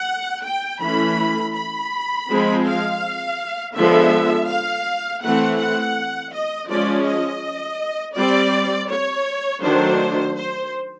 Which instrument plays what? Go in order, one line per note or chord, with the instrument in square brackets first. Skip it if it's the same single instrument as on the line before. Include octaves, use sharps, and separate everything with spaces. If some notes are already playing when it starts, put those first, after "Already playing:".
Already playing: [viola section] F#5
G5
E3 A3 C#4 B5
B5
F3 G#3 C4
F5
D3 F3 G#3 B3 E5
F5
E3 A3 C4 F#5
F#5
D#5
F3 G#3 C#4 D5
D#5
G3 C4 D5
C#5
D#3 F#3 A3 D4 C5
C5